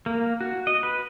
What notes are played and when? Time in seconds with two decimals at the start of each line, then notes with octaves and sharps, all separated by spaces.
0.06 A#3
0.41 F#4
0.67 D#5
0.83 B4